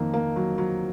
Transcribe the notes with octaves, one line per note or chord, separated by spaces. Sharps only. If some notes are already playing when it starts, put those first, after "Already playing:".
Already playing: F2 D#3 A#3
A#3
F#3
F#3